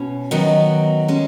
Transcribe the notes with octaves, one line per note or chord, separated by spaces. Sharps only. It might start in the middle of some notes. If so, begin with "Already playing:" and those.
Already playing: B2 C#4
D#3 F#3 B3 D#4
G#3 C#4